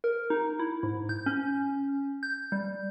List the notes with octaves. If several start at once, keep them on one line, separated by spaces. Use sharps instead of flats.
A#4
D#4
E4
G#2
G6
C#4
G6
G3